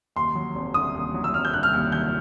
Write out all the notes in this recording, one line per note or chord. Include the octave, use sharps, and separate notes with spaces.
D#2 C6
F#3
F1
D3 D#6
D#2
F#3
E6
F1 F6
G6
D3 F#6
F6
D#2
F#3 G6